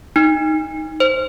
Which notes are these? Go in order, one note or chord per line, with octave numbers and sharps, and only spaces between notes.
D#4
C5